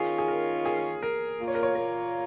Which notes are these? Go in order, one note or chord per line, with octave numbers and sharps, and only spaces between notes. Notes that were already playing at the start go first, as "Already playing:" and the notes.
Already playing: D#3 C#4 F4 G#4
G#4
A#4
G#4
A#4
A#2 A#3 F4
C#5
A#4
C#5
A#4